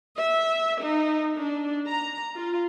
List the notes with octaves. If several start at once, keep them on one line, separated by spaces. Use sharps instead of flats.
E5
D#4
D4
A#5
F4